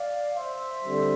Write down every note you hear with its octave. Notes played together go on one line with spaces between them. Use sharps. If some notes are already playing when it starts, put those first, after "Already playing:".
Already playing: D5 F5
C5 E5
D3 G3 C4